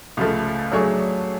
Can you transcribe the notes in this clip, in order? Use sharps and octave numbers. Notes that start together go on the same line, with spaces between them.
C#2 C#3 F3 A3
F#3 A3 D4 G#4 C#5